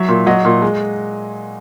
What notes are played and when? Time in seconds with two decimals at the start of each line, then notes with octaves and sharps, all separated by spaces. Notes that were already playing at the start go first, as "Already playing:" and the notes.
Already playing: F#3 E5
0.08 A#2
0.26 F#3 D#5 F#5
0.45 A#2
0.62 G#3